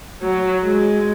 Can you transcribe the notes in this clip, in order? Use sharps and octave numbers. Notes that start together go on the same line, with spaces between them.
F#3
G#3